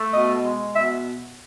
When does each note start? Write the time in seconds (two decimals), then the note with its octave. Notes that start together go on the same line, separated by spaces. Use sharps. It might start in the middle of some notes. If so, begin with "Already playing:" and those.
Already playing: A3
0.13 B2 D#5
0.45 G#3
0.75 B2 E5